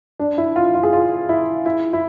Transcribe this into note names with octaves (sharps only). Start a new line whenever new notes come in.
D4
E4
F4
F4
G#4
F4
E4
E4
E4